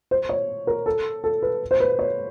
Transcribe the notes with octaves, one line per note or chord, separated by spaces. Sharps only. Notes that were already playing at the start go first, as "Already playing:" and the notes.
C5
C#5
A#4
A4
A4
B4
C5
B4
C#5